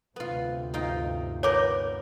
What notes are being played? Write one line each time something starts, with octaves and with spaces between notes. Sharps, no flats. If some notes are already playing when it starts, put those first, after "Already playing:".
D2 G2 C3 B3 F4
D#4 F4 G5
B3 A#4 C#5 D6 G6